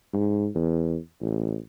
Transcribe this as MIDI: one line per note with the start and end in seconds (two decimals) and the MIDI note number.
0.13 0.47 44
0.55 0.97 40
1.21 1.57 33